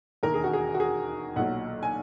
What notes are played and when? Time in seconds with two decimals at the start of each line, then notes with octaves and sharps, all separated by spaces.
0.23 E1 D#2 D#3 A#4
0.34 G#4
0.44 F#4
0.53 G#4
0.74 F#4
0.80 G#4
1.36 B1 A#2 F#3 F#5
1.83 G#5